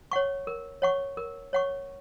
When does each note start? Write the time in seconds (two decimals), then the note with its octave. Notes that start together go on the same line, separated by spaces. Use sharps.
0.11 C#5 F#5 C#6
0.47 A#4
0.82 C#5 F#5 C#6
1.17 A#4
1.53 C#5 F#5 C#6